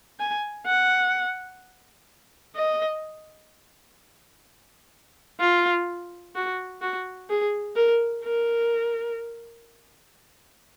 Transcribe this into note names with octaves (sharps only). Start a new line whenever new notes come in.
G#5
F#5
D#5
F4
F#4
F#4
G#4
A#4
A#4